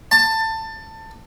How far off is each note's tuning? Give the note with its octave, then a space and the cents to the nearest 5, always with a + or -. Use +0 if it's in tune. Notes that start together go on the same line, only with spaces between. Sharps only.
A5 +20